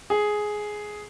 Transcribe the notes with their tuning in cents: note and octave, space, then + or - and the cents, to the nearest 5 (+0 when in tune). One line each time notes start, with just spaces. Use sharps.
G#4 +10